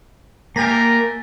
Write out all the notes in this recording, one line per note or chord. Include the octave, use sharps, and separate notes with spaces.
A3 A#3 G4 A#4 G#5 A#5 A6 B6